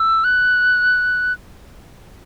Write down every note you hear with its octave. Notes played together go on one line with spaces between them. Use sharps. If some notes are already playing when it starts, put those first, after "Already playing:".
Already playing: E6
F#6